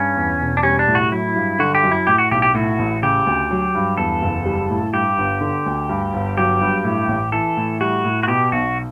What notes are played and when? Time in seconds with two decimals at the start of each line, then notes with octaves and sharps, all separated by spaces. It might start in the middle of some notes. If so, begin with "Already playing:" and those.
Already playing: G2 C#4
0.16 E2
0.40 E1
0.57 D4
0.63 G3 C#4
0.79 D4
0.87 A2
0.95 F#4
1.12 F#3 E4
1.36 G2
1.59 D3 F#4
1.75 G4
1.83 F#2
1.92 E4
2.07 A2 G4
2.18 F#4
2.31 B1 G4
2.42 G4
2.54 A2 F#4
2.79 A1
3.02 C#3 G4
3.26 D2
3.51 F#3
3.75 G2
3.98 E2 A4
4.22 F#1
4.45 G3
4.70 A2
4.93 G2 G4
5.18 G1
5.41 D3
5.66 D2
5.89 G2
6.14 G1
6.38 F#3 G4
6.61 G2
6.84 A2
7.09 A1
7.32 E3 A4
7.57 A2
7.81 G3 F#4
8.04 A2
8.23 F#4
8.27 B2 G4
8.52 B1 F#4